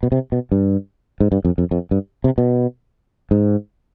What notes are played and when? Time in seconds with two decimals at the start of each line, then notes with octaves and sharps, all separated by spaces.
0.03 B2
0.12 C3
0.32 B2
0.52 G2
1.20 G#2
1.32 G2
1.45 F2
1.58 F2
1.71 F2
1.91 G2
2.24 C3
2.38 B2
3.31 G#2